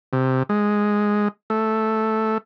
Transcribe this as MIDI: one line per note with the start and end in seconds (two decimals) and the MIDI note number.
0.13 0.43 48
0.49 1.28 56
1.50 2.38 57